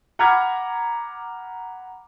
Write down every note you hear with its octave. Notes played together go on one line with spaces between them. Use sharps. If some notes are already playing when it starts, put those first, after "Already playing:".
F#5 A#5 B5 D6 F6 G#6